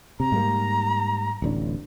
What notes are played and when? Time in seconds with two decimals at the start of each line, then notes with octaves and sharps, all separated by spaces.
0.20 C3 A#5
0.32 G#2 G3 A#3
1.42 D1 A1 D4